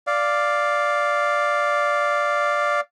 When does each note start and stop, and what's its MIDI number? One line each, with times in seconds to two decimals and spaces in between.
0.07 2.81 74
0.07 2.81 77